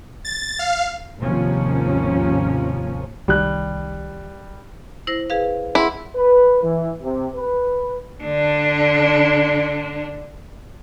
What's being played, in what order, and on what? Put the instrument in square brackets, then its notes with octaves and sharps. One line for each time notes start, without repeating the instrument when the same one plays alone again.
[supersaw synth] A6
F5
[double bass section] D#2 G#2 C3 F3 A#3 C#4
[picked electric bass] C2 D#3 [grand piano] G3 [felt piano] G4 F#6
[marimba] E4 C5 A#6
G#4 B4 F5
[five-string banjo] E4 [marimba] G#4 F#5 C6
[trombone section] B4
E3
C3
B4
[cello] D3 D4